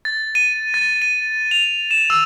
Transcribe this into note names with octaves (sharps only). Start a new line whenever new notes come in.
A6
D#7
A6
D#7
F7
E7
E6